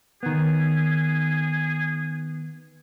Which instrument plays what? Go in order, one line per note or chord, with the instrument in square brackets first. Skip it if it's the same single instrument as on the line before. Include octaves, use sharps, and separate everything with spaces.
[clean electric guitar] D#3 B3 [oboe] G#4